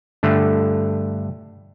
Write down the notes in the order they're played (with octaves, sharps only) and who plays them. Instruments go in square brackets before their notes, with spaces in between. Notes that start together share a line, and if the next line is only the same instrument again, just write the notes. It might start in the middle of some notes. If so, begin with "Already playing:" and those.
[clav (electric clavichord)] G2 D3 A3